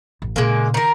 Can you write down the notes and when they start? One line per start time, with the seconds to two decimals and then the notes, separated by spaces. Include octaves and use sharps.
0.22 A1
0.36 A#2 C#3 G#3 A#3
0.74 D#3 A#4